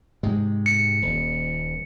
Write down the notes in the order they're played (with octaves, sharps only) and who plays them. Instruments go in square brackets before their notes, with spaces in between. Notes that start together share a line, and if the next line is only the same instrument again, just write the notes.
[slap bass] G#2 C3 G#3
[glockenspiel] C#7
[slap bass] D#1